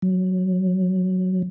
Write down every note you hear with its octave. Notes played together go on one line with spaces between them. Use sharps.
F#3